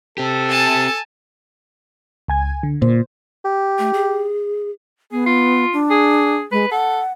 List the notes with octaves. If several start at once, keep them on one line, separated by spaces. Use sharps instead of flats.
C4 G4 A4
G#5 A5
C#2 G#5 G#6
D3
A#2 C5
G4
A3
G#4
B3 G#4
F4
D4
G#4
G#3 B4
A4 F#5